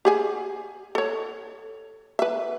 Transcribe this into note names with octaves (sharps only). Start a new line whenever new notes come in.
G4 G#4 G#5
A4 C#5
B4 E5